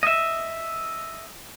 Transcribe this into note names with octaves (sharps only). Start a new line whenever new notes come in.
D#5 E5